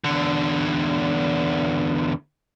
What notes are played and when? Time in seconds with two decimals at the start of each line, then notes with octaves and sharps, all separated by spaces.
0.04 E2 D3